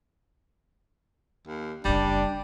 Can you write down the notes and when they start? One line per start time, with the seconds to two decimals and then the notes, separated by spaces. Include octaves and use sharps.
1.47 D#2
1.85 F#1 C#3 G3 D4